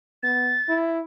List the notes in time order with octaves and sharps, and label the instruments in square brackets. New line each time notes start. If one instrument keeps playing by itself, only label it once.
[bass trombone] B3 [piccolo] A6
[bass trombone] E4